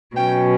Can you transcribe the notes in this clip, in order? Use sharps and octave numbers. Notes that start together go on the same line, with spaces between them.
B2 F#3 C#4 G5